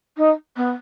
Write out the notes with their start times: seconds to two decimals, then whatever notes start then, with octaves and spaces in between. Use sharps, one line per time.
0.17 D#4
0.56 B3